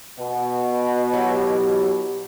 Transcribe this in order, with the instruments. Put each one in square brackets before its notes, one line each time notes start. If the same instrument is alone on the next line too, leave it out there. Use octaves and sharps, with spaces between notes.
[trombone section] B2
[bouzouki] F#3 E4 G4